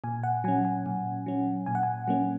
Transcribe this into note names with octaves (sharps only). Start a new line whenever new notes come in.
A#2 G#5
F#5
F#3 C#4 G#5
G#5
A#2
F#3 C#4
A#2 G#5
F#5
G#5
F#3 A#3 C#4